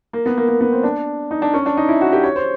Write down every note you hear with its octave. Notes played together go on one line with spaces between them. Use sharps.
A#3
B3
A#3
A#3
B3
C4
D4
D#4
D4
C#4
D4
D#4
E4
F#4
G4
C#5
C5